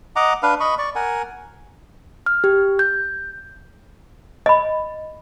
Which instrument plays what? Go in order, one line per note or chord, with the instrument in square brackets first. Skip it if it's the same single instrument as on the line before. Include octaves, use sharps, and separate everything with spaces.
[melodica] D#5 F#5 A#5 D6
D4 B4 F5
D#5 B5 C#6
D5 C#6
A#4 F#5 G#5
[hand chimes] F6
G4
G6
[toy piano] D#5 B5